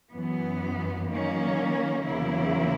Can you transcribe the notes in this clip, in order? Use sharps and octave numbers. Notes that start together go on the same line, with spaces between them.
F#2 E3 B3
D#3 F#3 A#3 C#4
E2 C#3 F#3 A#3 E4